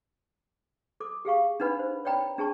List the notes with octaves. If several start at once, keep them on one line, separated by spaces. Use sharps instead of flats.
A4 D6
G4 G#4 F5 C#6
D4 D#4 B4 F#5 B5
C5
C#5 D5 G5 A#5 B5
D4 G#4 A5 C#6